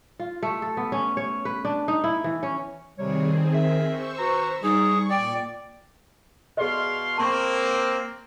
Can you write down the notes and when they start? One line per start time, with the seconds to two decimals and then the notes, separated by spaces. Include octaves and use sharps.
0.20 F4
0.43 A3
0.62 A4
0.77 B3
0.92 C#4
1.17 C#5
1.45 B4
1.65 D4
1.88 D#4
2.04 E4
2.24 E3
2.43 C#4
2.98 C3 D#3 G3 C4 G#4 C#5
3.54 A#4 E5
3.89 C5 C#6 E6
4.18 F#4 B4 A#5
4.63 G3 D#4 G#4 C#6
5.10 A#2 D5 G5
6.57 B2 G#4 D5 D#5 F5 C6
7.18 A#3 C4 A5 C6 C#6